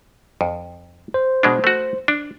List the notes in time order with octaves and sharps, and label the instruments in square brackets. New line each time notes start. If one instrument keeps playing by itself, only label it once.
[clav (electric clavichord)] F2
[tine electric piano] C5
[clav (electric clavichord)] B2 G#3 D4
A3 F#4
D4